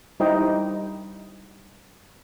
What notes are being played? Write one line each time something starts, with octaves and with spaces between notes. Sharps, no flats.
G3 D#4 E4 C5 D#5 G5